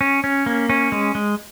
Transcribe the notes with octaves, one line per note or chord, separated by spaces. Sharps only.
C#4
C#4
A#3
C#4
G#3
G#3